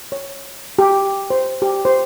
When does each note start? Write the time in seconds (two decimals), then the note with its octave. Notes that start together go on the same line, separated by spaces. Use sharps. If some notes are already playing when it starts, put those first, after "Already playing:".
0.12 C#5
0.79 G4
1.30 C5
1.62 G4
1.85 C5